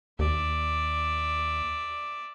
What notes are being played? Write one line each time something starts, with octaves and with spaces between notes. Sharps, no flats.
D#2 D5 E5